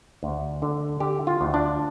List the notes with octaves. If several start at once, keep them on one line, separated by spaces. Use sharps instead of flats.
D2
D3
D3 G4
F4
D2
D4